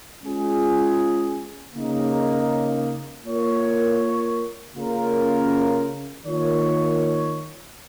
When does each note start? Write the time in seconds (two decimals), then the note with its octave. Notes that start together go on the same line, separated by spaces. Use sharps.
0.24 G#3 C#4 F4 G#4
1.74 C#3 A#3 D#4
3.25 A#3 F4 A#4 C#5
4.76 C#3 A#3 C#4 F4 A#4
6.25 D#3 A#3 F4 C#5